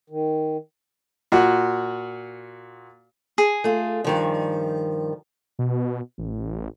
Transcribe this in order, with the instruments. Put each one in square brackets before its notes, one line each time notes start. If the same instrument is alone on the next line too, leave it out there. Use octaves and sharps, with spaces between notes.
[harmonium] D#3
[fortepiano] A#2 F#4
[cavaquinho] G#4
[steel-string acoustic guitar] A3 F4
G2 D#3 F3
[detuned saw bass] B2
A1